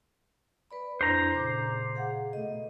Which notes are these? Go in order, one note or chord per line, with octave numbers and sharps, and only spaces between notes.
B4 D5 B5
F2 D4 E4 C5 A#5
A#2 C#3 D6
G#4 F5 F#5
B2 A3 D#5